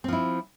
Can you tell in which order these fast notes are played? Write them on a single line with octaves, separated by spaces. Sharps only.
C4 F3 E4